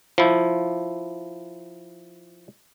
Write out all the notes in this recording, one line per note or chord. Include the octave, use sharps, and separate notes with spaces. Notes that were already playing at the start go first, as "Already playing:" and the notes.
F3 E4